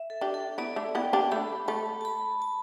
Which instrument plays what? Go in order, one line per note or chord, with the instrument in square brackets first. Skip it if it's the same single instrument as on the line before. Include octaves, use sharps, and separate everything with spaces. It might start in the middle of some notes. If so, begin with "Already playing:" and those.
Already playing: [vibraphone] E5
A4
[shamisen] D4 G4
[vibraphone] A4
[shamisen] B3 E4 [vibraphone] D5
[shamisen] A3 D4 [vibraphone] D5
[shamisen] B3 E4 [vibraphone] G5
[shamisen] D4 G4 [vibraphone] A5
[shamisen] A3 D4 [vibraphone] B5
[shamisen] A3 [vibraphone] A5
[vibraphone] A5
B5
A5